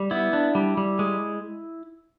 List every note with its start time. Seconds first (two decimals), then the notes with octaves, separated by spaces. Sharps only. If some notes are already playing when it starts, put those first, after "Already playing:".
Already playing: G3
0.11 B3 E4
0.33 D4
0.55 G3
0.77 G3
0.99 G#3